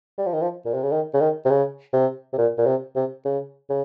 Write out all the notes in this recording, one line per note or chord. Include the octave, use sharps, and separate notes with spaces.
G3
F3
D#3
F3
A#2
C3
C#3
D#3
C#3
D#3
C3
C#3
C3
C3
A#2
A#2
C3
C3
C#3
C#3